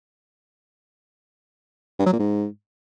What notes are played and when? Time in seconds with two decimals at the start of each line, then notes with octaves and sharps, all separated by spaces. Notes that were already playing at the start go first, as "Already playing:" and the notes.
1.99 G2
2.06 F#3
2.13 A#2
2.19 G#2